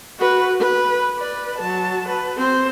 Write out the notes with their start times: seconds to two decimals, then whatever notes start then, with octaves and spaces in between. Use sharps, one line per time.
0.18 F#4 B4
0.60 B4
1.17 B4 D5
1.58 F#3 A5
2.08 B4
2.37 C4 C5